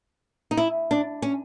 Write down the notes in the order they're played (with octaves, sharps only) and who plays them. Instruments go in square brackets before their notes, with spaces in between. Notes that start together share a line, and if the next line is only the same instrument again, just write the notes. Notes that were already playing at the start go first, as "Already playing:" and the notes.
[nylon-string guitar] D#4
E4
D4
C#4